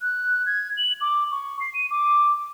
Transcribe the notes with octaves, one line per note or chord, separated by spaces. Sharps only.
F#6
G#6
F#7
D6
C#6
C7
D#7
D6